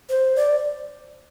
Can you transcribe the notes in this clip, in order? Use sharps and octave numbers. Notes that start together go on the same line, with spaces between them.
C5
D5